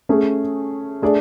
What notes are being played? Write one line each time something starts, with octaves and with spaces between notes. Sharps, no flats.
A3 C#4 G#4
A3 D4 G#4 D5